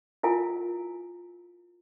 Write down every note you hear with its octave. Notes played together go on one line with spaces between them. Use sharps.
E4 F4 A#4 F5 G#5